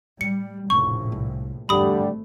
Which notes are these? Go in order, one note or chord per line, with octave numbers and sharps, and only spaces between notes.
A2 G3 C#7
F1 A#1 A2 C#3 C#6
C2
G#1 E2 G2 D3 G3 A3 B5 D#6